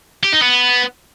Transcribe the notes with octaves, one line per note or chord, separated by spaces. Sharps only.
G4
D#4
B3